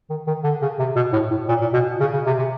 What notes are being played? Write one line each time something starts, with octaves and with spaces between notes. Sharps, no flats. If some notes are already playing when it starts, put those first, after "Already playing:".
D#3
D#3
D3
C#3
C3
B2
A2
A2
A#2
A#2
B2
C#3
C#3
C3
C3